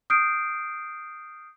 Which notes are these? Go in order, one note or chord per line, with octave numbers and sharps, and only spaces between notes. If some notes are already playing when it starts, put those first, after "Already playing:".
D#6 F6 G6 C7 D7